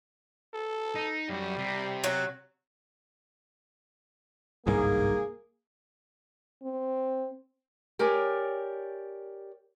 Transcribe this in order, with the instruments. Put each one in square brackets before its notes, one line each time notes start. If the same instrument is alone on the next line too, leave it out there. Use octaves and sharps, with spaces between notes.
[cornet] A4
[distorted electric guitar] D#4
[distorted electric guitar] F#2 F#4 [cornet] G3
[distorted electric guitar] C3
[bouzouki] F#3 F#4
[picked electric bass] G1 C2 G#2 [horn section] A#3 G#4
[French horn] C4
[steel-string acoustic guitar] G4 A#4 C#5 D5 G#5